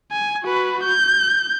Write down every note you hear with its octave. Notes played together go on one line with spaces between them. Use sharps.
G#5
F#4 B4
G6